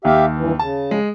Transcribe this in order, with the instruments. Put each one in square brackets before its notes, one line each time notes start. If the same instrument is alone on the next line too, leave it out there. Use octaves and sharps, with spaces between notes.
[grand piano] D#2 [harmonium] G4 E5 F5
[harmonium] G2 E3
[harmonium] C#3 [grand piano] A5
[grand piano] G#3